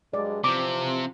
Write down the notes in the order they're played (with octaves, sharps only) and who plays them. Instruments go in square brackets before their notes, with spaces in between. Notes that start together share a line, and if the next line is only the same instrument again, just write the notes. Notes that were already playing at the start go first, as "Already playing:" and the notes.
[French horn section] G2 F#3 G#3 [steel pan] D5
[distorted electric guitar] C3 [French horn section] E3 F3 C4 [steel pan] D6